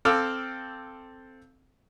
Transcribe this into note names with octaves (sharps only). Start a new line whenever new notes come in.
C4 A4 F5 D6 E6